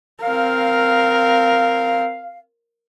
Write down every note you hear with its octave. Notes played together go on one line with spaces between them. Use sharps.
C4 A#4 F5